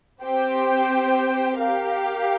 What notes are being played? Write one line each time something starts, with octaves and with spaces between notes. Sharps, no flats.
C4 G4 C5 G5
G4 A#4 F5